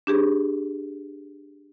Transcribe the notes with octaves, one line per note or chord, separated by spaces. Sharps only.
D4 G4 G#4